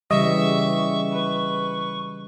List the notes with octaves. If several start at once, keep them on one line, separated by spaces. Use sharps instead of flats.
C#3 E3 G3 D#5 E5 C#6
B4